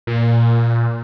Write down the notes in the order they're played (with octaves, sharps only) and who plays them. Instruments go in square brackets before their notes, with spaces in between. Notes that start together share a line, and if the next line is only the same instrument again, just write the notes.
[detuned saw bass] A#2